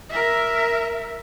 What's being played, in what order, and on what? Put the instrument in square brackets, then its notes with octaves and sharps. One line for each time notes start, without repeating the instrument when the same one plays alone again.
[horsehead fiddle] A#4 E5